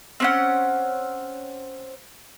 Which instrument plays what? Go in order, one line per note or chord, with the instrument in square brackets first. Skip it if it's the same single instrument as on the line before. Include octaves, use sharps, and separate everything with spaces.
[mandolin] C4 C#4 F#5